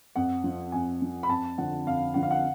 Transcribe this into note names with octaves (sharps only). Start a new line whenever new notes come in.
F2 F#5
F3
F2 G#5
F3
B5
F2 A5
D3 F3 F#5
F2 F5
D3 F3 F#5
F5
F#5